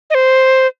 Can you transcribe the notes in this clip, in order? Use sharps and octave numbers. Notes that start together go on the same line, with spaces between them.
D#5
C5